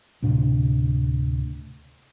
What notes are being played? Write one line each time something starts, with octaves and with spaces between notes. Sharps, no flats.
D2 A2 C3 D4